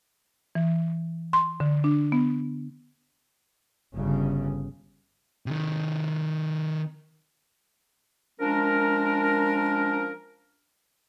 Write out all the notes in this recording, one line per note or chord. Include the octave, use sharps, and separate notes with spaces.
E3
C6
D3
D4
B3
G1 C#3
C3 D#3
F3 G#3 C#4 D4 A#4